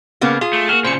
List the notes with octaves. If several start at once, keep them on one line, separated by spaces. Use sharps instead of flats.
C#3 A#3 B3
F4 G#4
A3
A#3 F#4 F6
A#2 C#3 C5 C#7